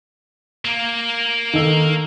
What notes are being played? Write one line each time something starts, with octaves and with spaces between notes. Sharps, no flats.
A#3
D#3 A4 E6